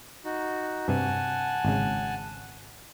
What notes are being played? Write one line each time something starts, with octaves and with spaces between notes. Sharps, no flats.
D#4 F#4
G2 C3 F#5 G#5 A5
G#1 C#3